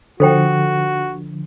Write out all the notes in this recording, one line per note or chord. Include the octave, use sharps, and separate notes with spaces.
D3 F3 F#4 A4 C5 G5